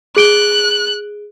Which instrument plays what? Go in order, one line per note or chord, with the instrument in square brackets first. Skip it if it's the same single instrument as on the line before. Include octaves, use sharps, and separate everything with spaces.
[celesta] G#4 D7 G7 [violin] F#6